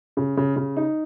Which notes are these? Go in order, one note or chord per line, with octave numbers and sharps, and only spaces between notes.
C#3
C#3
C#3
D#4